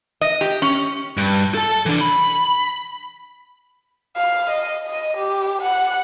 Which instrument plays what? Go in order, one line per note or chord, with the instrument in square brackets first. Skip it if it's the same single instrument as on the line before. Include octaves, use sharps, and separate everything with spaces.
[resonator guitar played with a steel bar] D#5
G4
C#4
[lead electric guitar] G2
A4 A5
E3 D4
B5
[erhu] F5
D#5
D#5
G4
F#5